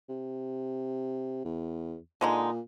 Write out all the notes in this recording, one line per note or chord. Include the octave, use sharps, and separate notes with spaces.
C3
E2
A#2 D3 G#3 D#4